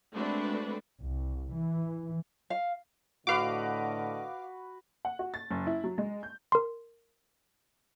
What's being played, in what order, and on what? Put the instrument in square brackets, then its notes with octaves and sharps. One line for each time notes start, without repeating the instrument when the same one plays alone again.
[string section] G#3 A3 C4 D4 F#4 B4
[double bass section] C2
E3
[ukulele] F5
[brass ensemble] A2 D3 D#5 [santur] F#4 B4 [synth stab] F5 D6
[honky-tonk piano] F#5
F#4
A6
F#1
E4
F#3
G#3
G6
[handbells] A#4 C6